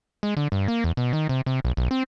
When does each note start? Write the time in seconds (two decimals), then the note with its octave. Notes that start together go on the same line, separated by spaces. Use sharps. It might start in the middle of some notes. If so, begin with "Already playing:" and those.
0.23 G#3
0.37 D3
0.52 G2
0.68 A#3
0.84 E2
0.97 B2
1.13 D#3
1.29 C3
1.46 C3
1.65 B1
1.77 B1
1.91 C4